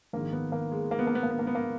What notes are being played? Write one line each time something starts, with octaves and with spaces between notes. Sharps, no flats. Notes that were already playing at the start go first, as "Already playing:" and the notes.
A#1 G#2 D#3 A#3
B3
A#3
G#3
A#3
B3
A#3
B3
A#3
B3
A#3
B3
A#3